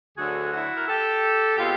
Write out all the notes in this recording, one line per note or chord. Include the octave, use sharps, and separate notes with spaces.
D2 D3 F#3 F#4 G#4
E4 F#4
A#4
G4 A4
B2 G#3 C4 F4 G4